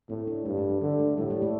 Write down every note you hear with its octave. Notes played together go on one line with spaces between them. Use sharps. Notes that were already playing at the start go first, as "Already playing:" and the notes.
A2 C4
D4
G2 C4
A3
G3
D3 G3
A3
A2 G3
G3
A3